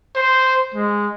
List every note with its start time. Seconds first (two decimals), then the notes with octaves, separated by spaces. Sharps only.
0.16 C5
0.74 G#3